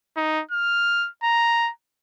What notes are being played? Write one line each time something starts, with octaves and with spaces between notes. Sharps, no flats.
D#4
F6
A#5